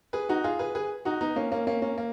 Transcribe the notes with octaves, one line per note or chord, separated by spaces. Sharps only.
G#4 B4
D#4 F#4
F4 G#4
G#4 B4
G#4 B4
D#4 F#4
B3 D#4
A#3 C#4
A#3 C#4
A#3 C#4
A#3 C#4
A#3